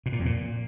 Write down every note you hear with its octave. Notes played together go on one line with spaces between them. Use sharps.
B2
A#2
F2
A#2